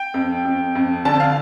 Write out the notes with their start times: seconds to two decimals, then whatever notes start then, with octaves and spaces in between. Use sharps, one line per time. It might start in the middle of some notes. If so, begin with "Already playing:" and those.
Already playing: G5
0.14 F2
0.45 F2
0.75 F2
1.05 D3 A5
1.20 F5